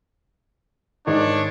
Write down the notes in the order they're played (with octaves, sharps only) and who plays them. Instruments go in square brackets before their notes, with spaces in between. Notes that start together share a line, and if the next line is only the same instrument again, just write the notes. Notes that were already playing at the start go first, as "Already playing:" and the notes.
[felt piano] G#2 D#3 [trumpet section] D4 C#5